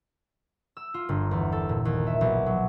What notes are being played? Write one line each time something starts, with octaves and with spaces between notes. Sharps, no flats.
E6
F4
G1
E2
A4
A#2
D#2
E5
B1
F#3